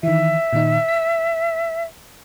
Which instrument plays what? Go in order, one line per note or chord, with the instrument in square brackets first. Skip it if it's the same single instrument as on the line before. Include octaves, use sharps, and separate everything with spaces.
[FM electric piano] D#3 E3 [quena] E5
[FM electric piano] A#2 D#3 D#4
B6